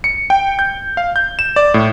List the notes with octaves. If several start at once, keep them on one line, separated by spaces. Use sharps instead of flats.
C#7
G5
G6
F5
G6
E7
D5
A2